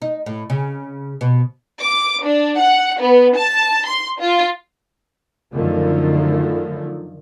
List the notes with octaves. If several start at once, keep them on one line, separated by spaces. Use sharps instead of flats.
D#4
A2
C#3
B2
D6
D4
F#5
B3
A5
C6
F4
F#2 D3 D#3 F3 A3